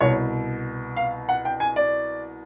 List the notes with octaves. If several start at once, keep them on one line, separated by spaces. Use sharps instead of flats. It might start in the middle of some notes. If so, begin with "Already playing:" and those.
C2 B2 C#5
F5
F#5
G5
G#5
D5